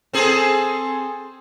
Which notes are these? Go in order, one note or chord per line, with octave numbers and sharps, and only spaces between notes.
C4 G#4 A4